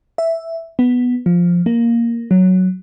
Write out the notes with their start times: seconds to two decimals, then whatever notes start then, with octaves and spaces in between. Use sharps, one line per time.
0.18 E5
0.79 B3
1.26 F3
1.66 A#3
2.31 F#3